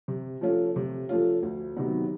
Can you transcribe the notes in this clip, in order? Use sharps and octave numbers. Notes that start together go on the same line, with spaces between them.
C3
F3 A3 C#4 F4
C3
F3 A3 C#4 F4
D2
C3 D#3 F#3 B3